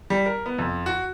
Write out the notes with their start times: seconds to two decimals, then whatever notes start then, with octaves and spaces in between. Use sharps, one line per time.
0.10 G3
0.26 A#4
0.46 B3
0.59 F2
0.86 F#4